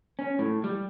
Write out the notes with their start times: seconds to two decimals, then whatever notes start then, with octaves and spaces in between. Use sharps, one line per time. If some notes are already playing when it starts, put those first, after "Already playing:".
0.19 C#4
0.39 A2
0.64 G3